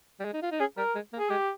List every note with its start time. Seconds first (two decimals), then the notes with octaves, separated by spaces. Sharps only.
0.20 G3
0.25 G#3
0.33 D#4
0.42 F4
0.51 D#4
0.60 C#4 G#4
0.77 G3 A#4
0.95 G#3
1.13 A#3
1.19 G#4
1.30 G#3 G4